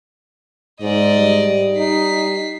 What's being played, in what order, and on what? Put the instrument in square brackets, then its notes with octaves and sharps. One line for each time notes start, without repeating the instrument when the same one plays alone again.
[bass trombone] G#2 [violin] D5 D#5
[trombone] G3
[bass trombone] D#4 [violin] B6 C7